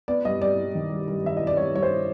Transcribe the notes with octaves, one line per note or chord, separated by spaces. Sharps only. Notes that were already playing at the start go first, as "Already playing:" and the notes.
B3 D5
G2 D#5
G3 D5
G3
D#3
G2
G2
D#3 E5
G3 D#5
D5
G3 C#5
G2 C#5
C5